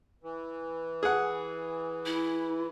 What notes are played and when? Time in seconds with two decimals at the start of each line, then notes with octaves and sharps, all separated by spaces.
0.23 E3
1.03 G#4 F#5
2.06 E4